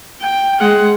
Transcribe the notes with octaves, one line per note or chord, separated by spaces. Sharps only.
G5
G#3 F#5